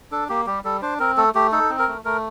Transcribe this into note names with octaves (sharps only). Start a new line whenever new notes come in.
D4 A4
A#3 G4
G3 G4
G3 A4
D4 C5
C4 A#4
A3 A4
A3 G4
D#4 A4
C4
A#4
A3
A3 A#4